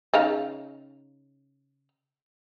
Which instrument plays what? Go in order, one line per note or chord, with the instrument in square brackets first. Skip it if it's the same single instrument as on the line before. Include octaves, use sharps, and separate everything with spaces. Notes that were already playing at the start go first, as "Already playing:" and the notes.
[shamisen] C#3 D#4 F5